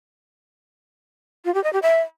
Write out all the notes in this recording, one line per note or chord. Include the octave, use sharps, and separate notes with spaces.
F4
G4
D#5
G4
E5